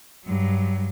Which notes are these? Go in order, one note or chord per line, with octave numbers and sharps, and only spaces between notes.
G2 F#3